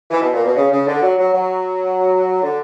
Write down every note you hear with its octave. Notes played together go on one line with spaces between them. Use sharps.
E3
B2
A#2
B2
C#3
C#3
D3
F#3
F#3
F#3
D3